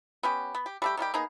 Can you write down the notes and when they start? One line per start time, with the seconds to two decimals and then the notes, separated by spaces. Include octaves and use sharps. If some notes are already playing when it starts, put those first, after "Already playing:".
0.23 B3 C#4 G4
0.55 B3
0.66 G4
0.82 G3 A3 G4
0.97 D#3 G3 F4 G4
1.14 A#3 B3 D#4 G#4